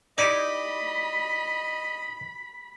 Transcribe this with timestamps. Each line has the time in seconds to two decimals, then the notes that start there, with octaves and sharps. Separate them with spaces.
0.18 D#4 E4 G4 D5 D#5 B5